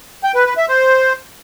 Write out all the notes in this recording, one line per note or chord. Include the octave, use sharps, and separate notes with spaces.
G5
B4
B4
E5
C5